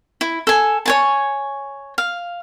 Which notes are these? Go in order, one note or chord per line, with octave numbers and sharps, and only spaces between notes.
E4
A4 G#5
C#5 G#5 A5
F5